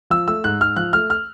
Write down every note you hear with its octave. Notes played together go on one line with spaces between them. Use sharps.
F3 E6
A3 E6
G#2 F#6
G#2 F6
F3 F#6
A3 F6
F6